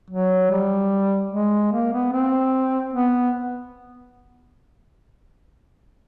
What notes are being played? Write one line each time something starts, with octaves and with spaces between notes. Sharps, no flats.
F#3
G3
G#3
A#3
B3
C4
B3